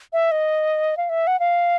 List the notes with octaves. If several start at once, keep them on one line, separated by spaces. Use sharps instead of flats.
E5
D#5
F5
E5
F#5
F5